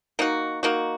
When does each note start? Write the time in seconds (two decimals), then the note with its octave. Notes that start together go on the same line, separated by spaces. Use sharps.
0.19 A#3 D#4 F#4
0.63 A#3 D#4 F#4